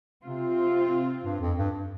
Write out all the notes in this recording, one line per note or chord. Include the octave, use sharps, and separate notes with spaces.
C3 C4 F4
G2
F2
G2